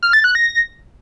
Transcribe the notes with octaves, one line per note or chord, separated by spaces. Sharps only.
F6
A6
F#6
A#6